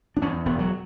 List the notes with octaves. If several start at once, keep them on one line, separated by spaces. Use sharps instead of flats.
D4
E2 C#4
E1 B3
F#3